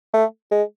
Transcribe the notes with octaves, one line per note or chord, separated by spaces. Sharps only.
A3
G#3